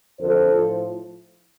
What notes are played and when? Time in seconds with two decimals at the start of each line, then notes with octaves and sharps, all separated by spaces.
0.19 F2 D3 F3 A4 C5
0.52 A2 F3